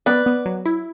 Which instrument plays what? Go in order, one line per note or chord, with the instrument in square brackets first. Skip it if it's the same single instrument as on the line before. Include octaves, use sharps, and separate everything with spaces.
[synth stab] B3 [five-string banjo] B4 D5
[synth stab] B3
F#3
E4